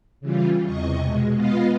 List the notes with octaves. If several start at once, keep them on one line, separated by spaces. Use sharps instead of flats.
C#3 E3 G3 F4
E2 C3 D#5 C#6
B2 G#3
G#3 B3 F4 B4 D#5 F5